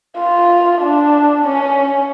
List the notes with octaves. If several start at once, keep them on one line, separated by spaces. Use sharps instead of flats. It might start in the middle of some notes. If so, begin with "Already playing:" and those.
F4
D4
C#4